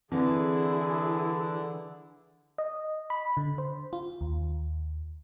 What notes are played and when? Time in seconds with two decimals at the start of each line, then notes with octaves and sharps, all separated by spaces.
0.12 D3 E3 C4 E4 G#4
2.58 D#5
3.10 B5
3.37 D3
3.58 C5
3.93 F4
4.21 D#2